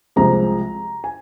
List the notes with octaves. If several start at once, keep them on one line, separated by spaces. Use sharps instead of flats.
C2 C3 F3 G#3 A#5
G#5